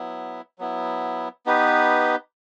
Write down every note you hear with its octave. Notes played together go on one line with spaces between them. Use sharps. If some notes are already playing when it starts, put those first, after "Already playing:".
Already playing: F#3 B3 E4
F#3 B3 E4
B3 D#4 G4 B4